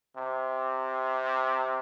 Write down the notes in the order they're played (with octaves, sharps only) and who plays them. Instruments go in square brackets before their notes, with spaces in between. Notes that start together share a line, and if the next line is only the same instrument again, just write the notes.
[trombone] C3